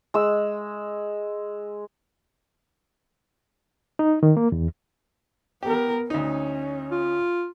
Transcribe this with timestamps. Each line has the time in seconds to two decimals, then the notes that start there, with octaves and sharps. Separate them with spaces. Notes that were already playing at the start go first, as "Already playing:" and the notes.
0.14 G#3 E6
3.99 D#4
4.23 D#3
4.37 A#3
4.52 E2
5.63 B3 G4 A#4
6.10 D2 C#4 D#4
6.91 F4